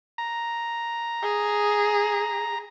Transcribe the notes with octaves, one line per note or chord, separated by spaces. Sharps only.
A#5
G#4